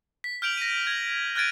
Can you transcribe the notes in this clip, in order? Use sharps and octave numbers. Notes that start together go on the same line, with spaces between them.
B6
F6 G6 D7 F7 F#7
A#6 D#7
G#6 F#7
F6 F#6 G#6 A6 D7 D#7